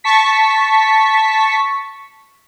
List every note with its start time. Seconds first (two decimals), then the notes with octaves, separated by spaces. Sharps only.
0.04 A5 C#6 B6